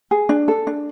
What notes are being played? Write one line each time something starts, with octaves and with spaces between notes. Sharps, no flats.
G#4
D4
A4
D4